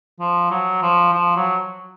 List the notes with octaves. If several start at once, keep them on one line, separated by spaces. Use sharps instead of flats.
F3
F#3
F3
F3
F#3